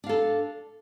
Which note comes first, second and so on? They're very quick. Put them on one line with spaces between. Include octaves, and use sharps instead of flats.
D4 F5 A4